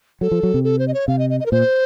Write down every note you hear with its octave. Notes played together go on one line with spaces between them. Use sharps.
F#3 A4
F3
F#3
C3
A4
C5
D#5
C#5
C3 F5
D#5
D#5
D#5
A#4
A#2 C5